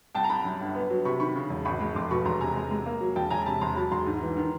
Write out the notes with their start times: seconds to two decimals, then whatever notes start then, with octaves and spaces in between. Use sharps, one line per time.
0.15 C2 G5 A5
0.24 A#5
0.30 C2 A5 B5
0.45 F#2
0.60 G1
0.75 B3
0.90 F#3
1.05 C3 B5 C#6
1.20 D#3 B5 C#6
1.36 C#3
1.50 E1
1.65 G#1 B5 C#6
1.80 G#3
1.95 F1 C6 D6
2.11 B2 B5 C#6
2.25 E1 A#5 C6
2.40 C3 G#5 A#5
2.56 G#3
2.71 G#3
2.86 A#3
3.01 F#3
3.16 E1 G5 A5
3.31 E1 G#5 A#5
3.42 A#5
3.46 C3 A5 B5
3.61 E2 A#5 C6
3.76 F#3 A5 B5
3.92 E1 A#5 C6
4.06 G#2
4.21 E3
4.37 D#3